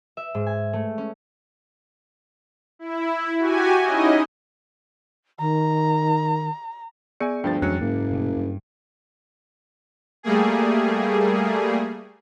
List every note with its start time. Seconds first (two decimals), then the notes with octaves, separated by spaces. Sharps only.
0.17 E5
0.35 G#2
0.46 G#5
0.73 A3
0.98 C#4
2.79 E4
3.38 F#4 G4 G#5
3.84 C#4 D#4 E4 D#5
5.39 D#3 A#5
7.20 B3 G#4 D5 G#5 C#7
7.44 D2 G2 F3 G5 A6
7.62 F2 E3 F#3 G#3 C#4 F#6 C#7
7.81 F#1 G#2 A#3
8.10 G2 B2 A3
8.37 G2
10.23 G3 A3 A#3 G#4